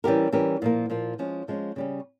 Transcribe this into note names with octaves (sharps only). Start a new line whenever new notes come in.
E3 G3 C#4 G4 A#4
E3 G3 C#4 G4 A#4
A#2 F3 A#3
A#2 F3 A#3
F3 G#3 C#4
F3 G#3 C#4
C#3 G3 C#4